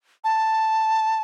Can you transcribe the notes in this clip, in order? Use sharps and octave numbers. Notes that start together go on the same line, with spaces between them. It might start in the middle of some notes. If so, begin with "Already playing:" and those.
A5